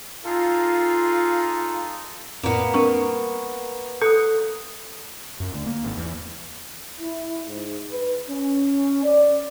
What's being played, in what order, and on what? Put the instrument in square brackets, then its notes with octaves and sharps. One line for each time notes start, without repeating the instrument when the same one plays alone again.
[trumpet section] D#4 G#4 A4 [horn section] F4
[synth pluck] F2 A2 [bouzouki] A#3 B3
[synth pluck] G3 C4 D4 [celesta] A#4 C#6
[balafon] A4 [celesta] D#6 F#6 C#7
[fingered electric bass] F#2
D2
A#3
G#1
E2
[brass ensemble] E4
G#2
B4
C#4
D5